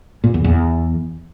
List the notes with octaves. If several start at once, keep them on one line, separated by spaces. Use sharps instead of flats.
A#2
E2
E2